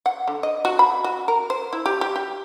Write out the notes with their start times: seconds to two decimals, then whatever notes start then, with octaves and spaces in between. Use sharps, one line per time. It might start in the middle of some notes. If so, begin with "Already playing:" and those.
0.06 F#5
0.28 D3
0.43 D#5
0.65 F#4
0.79 B5
1.04 F#4
1.28 A#4
1.50 C5
1.73 E4
1.86 G4
2.01 G4
2.16 G4